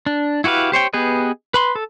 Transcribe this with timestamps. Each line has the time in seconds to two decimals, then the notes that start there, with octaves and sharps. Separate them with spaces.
0.06 D4
0.44 E4 F#4 G4 B4 F5
0.72 G4 C5 C#5 G5
0.93 B3 G4 G#4 B4 D#5
1.54 B4 B5 C6
1.75 A4